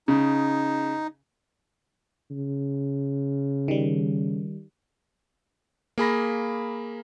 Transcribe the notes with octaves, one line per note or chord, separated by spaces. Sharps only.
C#3 D#4
C#3
D#3 G3
A#3 G#4 B5 A#6